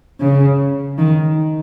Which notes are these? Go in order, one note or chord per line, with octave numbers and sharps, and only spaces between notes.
C#3
D#3